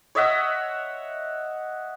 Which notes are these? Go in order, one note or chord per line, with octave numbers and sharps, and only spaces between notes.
C#5 D#5 E5 F#5